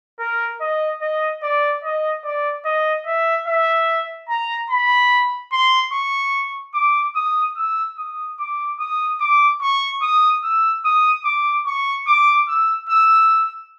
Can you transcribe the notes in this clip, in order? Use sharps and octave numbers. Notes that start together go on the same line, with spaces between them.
A#4
D#5
D#5
D5
D#5
D5
D#5
E5
E5
A#5
B5
C6
C#6
D6
D#6
E6
D#6
D6
D#6
D6
C#6
D#6
E6
D#6
D6
C#6
D6
E6
E6